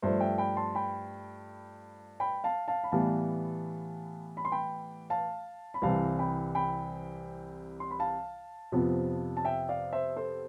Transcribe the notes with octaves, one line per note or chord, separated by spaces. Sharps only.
G2 F3 A3 C5 E5
E5 G5
G5 B5
A5 C6
G5 B5
G5 B5
F5 A5
F5 A5
B5
A2 E3 G3 B3 F5 A5
B5
C6
G5 B5
F5 A5
B5
C2 C3 E3 F5 A5
G5 B5
G5 B5
C6
B5
F5 A5
F2 C3 F3 B3
A5
E5 G5
D5 F5
C5 E5
A4 C5